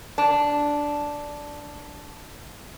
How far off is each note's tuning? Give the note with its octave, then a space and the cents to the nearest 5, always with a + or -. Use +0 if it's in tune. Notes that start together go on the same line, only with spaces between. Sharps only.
D4 -5